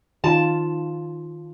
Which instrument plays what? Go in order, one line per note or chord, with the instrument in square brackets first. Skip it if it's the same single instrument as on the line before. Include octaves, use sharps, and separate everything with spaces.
[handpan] D#3 F4 [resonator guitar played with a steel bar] A5